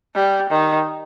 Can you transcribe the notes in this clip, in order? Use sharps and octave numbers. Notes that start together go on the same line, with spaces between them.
G3
D#3